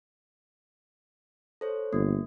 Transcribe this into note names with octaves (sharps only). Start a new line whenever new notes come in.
A4 C5 C#5
G1 A#3